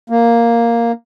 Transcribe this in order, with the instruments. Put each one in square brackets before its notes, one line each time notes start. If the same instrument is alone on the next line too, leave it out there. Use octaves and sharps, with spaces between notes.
[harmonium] A#3